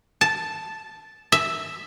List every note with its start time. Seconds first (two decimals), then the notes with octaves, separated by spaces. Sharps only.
0.21 A5
1.32 E5